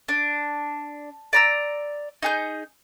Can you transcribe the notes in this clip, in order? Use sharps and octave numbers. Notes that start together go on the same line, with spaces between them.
D4
D5 A#5 E6
D#4 G#4 G6